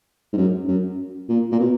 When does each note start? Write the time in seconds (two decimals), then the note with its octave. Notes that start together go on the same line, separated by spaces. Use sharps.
0.33 G#2
0.38 F#2
0.68 F#2
1.29 A#2
1.52 A#2
1.60 B2